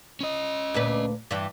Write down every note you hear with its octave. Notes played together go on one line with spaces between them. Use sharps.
C#4 D#5
D2 A#2 B4
G2 E3